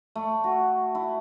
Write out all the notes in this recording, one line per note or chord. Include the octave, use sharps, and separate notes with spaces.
A3
F#4
E4